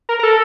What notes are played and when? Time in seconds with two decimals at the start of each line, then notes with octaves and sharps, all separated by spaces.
0.09 A#4
0.19 A#4
0.23 A4